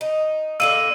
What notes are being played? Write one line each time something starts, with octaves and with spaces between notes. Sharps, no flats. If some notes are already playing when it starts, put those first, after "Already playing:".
D#4
D3 F#3 A#3 E6 D#7